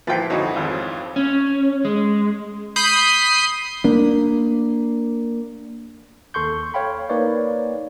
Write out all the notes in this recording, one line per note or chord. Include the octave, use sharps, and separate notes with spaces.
A#2 E3 F3 B4 G5 A6
F2 D3 D#4 F#4 C#5
G#1 F4
C#4
G#3
B5 D#6 G6 C7
A#3 D4
D#2 A4 C6 C#6 G6
C#5 F5 G5 B5
A#3 D#4 B4 C#5 D5